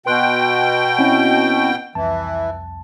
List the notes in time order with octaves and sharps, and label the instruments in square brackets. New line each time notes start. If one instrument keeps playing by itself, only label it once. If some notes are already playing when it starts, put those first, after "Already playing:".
[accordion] B2 G5 [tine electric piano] B4 C6 F#6
[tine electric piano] C4 C#4 E4
[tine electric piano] C2 F2 A5 [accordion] E3